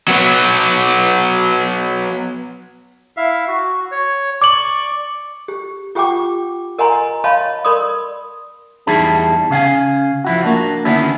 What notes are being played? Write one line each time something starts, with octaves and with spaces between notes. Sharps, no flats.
F#3 B3
E4 E5 F5
F#4
C#5
D5 C#6 D6 F#7
G4
F4 G4 F#5 G5 D6
A#4 D#5 F#5 G#5 A#5 C6
C#5 D#5 F5 A5 B5 C6
A#4 D5 B5 C6 D#6
E2 G3 D#4 E4 G#4 A5
C#3 F5 F#5 G#5
F3 E4 F#4
A#3 D4 F#4
D3 D#3 B3 C#4 E4